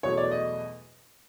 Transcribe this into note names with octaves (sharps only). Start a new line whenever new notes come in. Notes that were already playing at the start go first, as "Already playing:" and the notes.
E2 B2 F#3 A3 C#5
D5
D#5